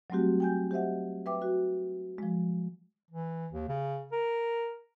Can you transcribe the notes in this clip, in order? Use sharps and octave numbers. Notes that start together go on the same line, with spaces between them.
F#3 G3 A3 C4 F#4 G4
G5 G#5 G6
G4 C5 D#5 E5 F#5
B4 E5 G5 D6
F#4 B4
F3 G#3
E3
D#2
C#3
A#4